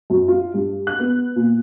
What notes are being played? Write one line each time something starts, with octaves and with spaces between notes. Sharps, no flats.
F#2
F4
G2
F#6
B3
A#2